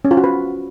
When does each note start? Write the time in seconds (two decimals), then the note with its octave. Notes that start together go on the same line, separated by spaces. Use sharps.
0.05 C#4
0.11 F4
0.17 F#4
0.24 B4